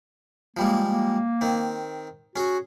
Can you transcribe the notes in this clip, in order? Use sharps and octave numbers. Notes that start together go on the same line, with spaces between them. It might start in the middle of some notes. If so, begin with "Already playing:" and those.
F3 G3 G#3 A#3
A#3
D#3 C4
C#4 F#4 G#4